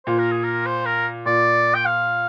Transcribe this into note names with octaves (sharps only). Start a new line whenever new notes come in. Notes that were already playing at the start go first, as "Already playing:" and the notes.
A#2 C5
A#4
G#4
A#4
C5
A#4
A#2 D5
G5
F5